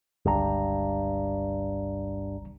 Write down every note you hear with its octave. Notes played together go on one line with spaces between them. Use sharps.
G1 C#2 G2 A#5